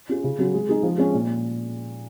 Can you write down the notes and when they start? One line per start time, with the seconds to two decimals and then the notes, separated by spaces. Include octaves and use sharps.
0.09 C#4 F4 G#4
0.24 C#3
0.39 F#3 C#4 F#4
0.54 G#3
0.69 D#4 G#4
0.83 F3
0.98 G#3 C#4
1.14 A#2